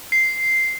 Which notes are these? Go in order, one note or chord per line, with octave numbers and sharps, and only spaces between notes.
C7